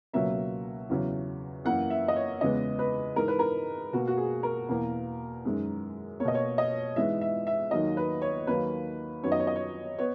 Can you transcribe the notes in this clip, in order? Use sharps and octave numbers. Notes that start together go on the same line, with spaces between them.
C#2 B2 F#3 A#3 E5
E2 C#3 F#3
F#2 E3 A#3 F#5
E5
D#5
C#5
E2 C#3 E3 G#3 B3 D#5
B4
G#2 E3 G#3 A#4
B4
A#4
B2 A#3 F#4
F#4
G#4
A#4
E2 B2 A#3
F#2 D#3 G#3
B2 A#3 C#5 D#5
C#5
D#5
G#2 E3 G#3 B3 E5
E5
E5
D#2 D#3 F#3 A#3 D#5
B4
C#5
D#2 D#3 F#3 A#3 B4
F#2 D#3 F#3 B3 C#5
D#5
C#5
D#5
C#5
B3 C#5